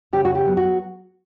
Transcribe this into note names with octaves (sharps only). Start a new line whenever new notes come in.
C#3 G4
F#4
G4
F#3 B3
F#4